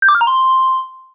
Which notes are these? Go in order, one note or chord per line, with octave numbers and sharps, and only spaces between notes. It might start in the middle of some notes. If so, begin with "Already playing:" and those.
G6
D6
F6
A#5
C6